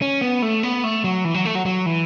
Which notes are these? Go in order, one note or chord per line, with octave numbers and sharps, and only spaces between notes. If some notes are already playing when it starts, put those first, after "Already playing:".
C#4
B3
A3
B3
A3
F#3
E3
F#3
A3
F#3
F#3
E3